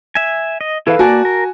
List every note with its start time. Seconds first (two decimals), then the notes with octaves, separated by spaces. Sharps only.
0.15 E5 G#5
0.61 D#5
0.87 E3 E4 A4 B4 F5
0.99 A#3 F#4 D5 G#5 A5
1.25 A#4